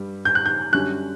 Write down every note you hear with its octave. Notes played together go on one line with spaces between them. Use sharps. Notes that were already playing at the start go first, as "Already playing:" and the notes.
Already playing: G2 G3
G6
F#6
G6
F#2 D3 G3 C#4 F#6